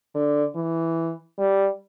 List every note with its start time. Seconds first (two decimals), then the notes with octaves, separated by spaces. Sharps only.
0.14 D3
0.55 E3
1.39 G3